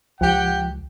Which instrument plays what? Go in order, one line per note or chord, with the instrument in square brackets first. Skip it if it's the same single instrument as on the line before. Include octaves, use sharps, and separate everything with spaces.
[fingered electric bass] C#2 [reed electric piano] F3 [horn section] G4 F#5 G5